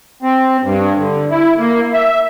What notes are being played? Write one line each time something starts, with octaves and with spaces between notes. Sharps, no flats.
C4
G2
D3
E4
A#3
E5